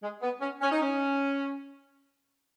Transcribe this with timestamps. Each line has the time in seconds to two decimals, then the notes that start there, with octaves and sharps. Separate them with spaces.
0.02 G#3
0.22 B3
0.41 C#4
0.61 C#4
0.71 D#4
0.81 C#4